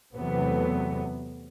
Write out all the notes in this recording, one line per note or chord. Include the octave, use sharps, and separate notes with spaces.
E2 C3 F#3 A3 B3